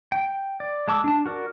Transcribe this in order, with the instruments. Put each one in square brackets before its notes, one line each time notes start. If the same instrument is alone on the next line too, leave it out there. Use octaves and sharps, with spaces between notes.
[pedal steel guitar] G5
D5
G#3 A5 D6 E6
D4 A5
F#4 A#4 D5